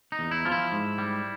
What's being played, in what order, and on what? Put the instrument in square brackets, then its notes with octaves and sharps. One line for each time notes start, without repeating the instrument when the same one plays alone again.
[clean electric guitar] D#4
E2
E4
F3 F4
E4
G#2
G3